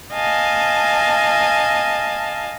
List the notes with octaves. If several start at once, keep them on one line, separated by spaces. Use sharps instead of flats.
D#5 F5 G#5 A5